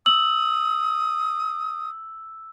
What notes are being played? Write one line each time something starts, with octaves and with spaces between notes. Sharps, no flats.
D#6 E6 F#7